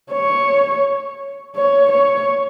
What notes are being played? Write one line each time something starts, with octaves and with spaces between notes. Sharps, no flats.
C#5
C#5
C#5